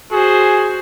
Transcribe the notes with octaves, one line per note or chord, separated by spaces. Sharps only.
F#4 G#4 C5